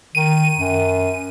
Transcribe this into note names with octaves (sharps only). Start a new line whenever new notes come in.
D#3 D#7
F#2